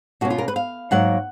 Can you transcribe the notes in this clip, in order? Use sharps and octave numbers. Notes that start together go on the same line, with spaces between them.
B2 A#3 C#4 F#4
F4
A#4
B4
F5
G#2 F#3 A#3 F#5